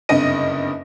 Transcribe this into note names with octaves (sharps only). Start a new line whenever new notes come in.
F#1 G2 C3 D#5 A#6 D#7